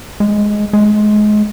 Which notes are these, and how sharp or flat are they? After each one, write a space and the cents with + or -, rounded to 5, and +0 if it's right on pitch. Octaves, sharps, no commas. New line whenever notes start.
G#3 +5
G#3 +25